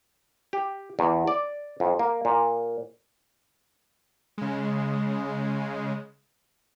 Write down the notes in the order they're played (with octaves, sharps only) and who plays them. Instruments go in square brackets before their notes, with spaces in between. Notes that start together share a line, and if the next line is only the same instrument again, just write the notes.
[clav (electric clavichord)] G4
E2
D5
F2
A#3
A#2
[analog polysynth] C#3 G#3